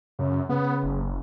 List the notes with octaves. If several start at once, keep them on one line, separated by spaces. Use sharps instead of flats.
F#2 C#3
C#3 B3
F#1